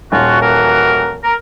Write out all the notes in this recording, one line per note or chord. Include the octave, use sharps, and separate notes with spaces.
D#1 F4 F#4
E3 F#4 A#4
A#4